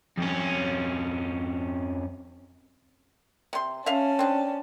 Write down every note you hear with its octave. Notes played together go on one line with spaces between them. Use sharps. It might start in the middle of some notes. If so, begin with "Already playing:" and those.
F2 C#4
C3 C6
C#4 E5 F5 A5
C4 D4